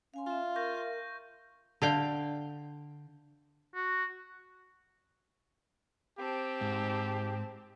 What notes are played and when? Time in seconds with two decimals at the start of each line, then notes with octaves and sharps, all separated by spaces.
0.14 C#4 F5 G#5 C6
0.26 F4 E5 F5
0.56 A#4 C#6 G6 A#6
1.82 D3 F5 G5
3.75 F#4
6.19 C4 G4 A5
6.61 G#2